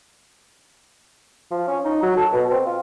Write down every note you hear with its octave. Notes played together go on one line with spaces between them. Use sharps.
F3
C#4
D#4
F#3
A4
B2
C4
F4